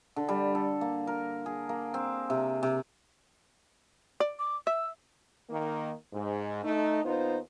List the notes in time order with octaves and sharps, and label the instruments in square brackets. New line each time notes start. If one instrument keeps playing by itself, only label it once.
[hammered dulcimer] D3
G3
A4
A#3
A#4
G#4
A#3
C4
C3
C3
[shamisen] D5
[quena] D6
[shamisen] E5 [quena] E6
[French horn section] D#3 A#3
G#2
A3 D#4
D#2 B3 D#4 F4 C5